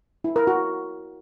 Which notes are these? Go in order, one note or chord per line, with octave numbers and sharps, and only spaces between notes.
E4
A#4
F#4